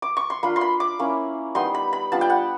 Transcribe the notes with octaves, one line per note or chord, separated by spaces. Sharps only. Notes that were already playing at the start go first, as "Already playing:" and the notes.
D6
C#6
C6
A#3 D4 F4 B5
C6
B5
D6
A#3 C#4 E4
G3 B3 D#4 C6
B5
B5
G3 B3 D4 F4 A5
G5
F#5